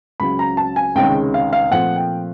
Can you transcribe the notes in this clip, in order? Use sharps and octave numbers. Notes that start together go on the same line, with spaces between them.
C#2 C#3 F#3 B5
A#5
A5
G#5
C#2 C3 D#3 G#3 C#4 G5
F5
F5
A#2 F3 A3 C4 F#5
G5